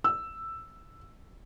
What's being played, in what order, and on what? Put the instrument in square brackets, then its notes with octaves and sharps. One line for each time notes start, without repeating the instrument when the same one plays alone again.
[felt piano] E6